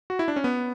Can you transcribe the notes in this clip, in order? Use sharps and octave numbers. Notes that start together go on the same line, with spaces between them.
F#4
E4
D4
C#4
B3